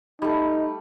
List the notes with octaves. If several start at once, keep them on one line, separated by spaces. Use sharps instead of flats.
G3 A3 D#4